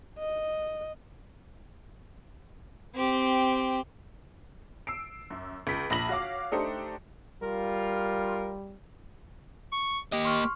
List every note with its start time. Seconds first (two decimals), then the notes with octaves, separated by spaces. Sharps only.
0.19 D#5
2.95 C4 G4
4.87 E6 C7 D7
5.31 F#2
5.67 C#2 B6
5.90 A#1 B5 A#6 F#7
6.09 F#4 C#5 F5 D6
6.52 A3 D4 D#4 G4 C5 C#7
7.42 G3 F4 A#4
9.72 C#6
10.12 A#3 G4 D#5
10.25 C6 C#6 F6